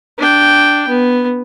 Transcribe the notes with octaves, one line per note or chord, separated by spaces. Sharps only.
D4 G5
B3